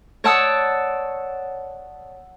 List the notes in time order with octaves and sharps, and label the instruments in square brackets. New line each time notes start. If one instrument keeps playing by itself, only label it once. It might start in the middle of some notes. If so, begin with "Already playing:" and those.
[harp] C#5 D5 F#5 A5 D#6 E6